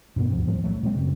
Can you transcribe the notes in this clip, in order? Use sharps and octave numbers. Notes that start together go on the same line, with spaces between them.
G2 B2 B3
D#2 G#2 F3 C4
A2 F3 G3
B1 F#3 A3
A#2 G#3 C4
F#2 C#3